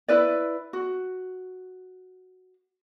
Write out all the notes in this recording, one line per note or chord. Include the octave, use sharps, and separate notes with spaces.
E4 B4 D5
F#4